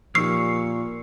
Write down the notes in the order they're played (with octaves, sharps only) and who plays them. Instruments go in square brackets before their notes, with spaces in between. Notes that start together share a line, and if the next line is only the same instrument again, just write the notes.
[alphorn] A#2 [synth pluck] F3 D#4 G4 [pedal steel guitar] C#6 E6 F6 [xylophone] C7